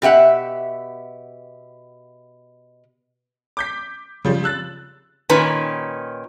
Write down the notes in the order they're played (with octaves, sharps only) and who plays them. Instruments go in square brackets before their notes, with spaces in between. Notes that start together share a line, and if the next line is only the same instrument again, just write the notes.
[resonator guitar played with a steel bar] B2 G4 E5 F#5
[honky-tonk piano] D6 G6 B6
C#3 F3 G3
E6 F#6 A6
[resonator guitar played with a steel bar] A#2 D#3 C#4 B4 A#5